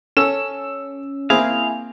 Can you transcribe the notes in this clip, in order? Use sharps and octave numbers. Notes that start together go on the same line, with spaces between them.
C#4 A4 E6 E7
A#3 C4 E4 G#4 F5